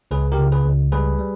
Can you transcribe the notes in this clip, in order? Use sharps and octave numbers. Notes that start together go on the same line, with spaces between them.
C#2 G#4 B4
G4 A#4
C#3
G#4 B4
C#2
G3 G#4 B4
G3